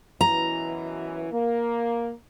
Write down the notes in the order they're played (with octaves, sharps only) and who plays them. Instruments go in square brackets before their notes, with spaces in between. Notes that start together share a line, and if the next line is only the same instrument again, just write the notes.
[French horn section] F#2 B2 E3 [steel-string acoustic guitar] A#5
[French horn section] A#3